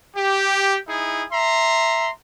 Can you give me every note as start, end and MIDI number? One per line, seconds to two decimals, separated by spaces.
0.16 0.76 67
0.88 1.24 63
0.88 1.24 64
0.88 1.24 68
1.31 2.10 76
1.31 2.10 82
1.31 2.10 84